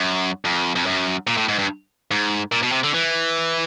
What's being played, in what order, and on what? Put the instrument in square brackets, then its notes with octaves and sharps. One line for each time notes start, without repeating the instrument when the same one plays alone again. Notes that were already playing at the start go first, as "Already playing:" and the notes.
Already playing: [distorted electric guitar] F#2
F2
F2
F#2
A#2
A2
G#2
G2
G#2
A#2
B2
C3
D3
E3